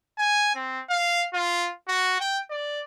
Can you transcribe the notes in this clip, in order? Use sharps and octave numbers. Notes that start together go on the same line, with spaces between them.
G#5
C4
F5
F4
F#4
G5
D5